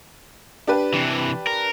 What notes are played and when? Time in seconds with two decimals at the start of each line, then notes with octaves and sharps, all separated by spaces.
0.67 D4 G4 B4
0.93 C3 E3
1.47 A#4